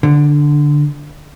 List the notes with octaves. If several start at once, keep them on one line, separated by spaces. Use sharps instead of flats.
D3